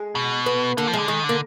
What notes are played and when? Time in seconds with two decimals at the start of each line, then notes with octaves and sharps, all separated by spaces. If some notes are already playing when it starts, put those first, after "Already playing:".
Already playing: G#3
0.15 B2
0.46 B3
0.77 D3 A#3
0.87 F3
0.93 D3 G#3
1.08 D#3 G#3
1.24 D3
1.29 A#3